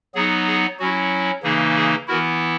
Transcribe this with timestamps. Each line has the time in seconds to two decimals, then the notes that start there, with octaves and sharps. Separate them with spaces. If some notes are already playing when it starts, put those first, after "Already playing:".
0.14 F#3 B3 D#4 G#4
0.47 G#4
0.79 F#3 C#4 E4 F#4
1.43 C#3 E3 A#3 D#4 G#4
1.76 G#4
2.07 E3 B3 E4 F#4 A#4